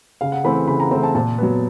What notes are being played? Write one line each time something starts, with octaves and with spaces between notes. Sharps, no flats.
C#3 F5
F#5
E3 A3 C4 B5
C#3 B5
A#5
E3 A3 C4 A#5
A5
A#2 A5
F#3 B3